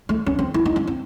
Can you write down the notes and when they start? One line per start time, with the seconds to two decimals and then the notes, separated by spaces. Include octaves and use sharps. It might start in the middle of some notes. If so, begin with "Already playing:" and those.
0.09 A3
0.26 C#4
0.39 C4
0.54 E4
0.66 D#4
0.76 C#4
0.87 C4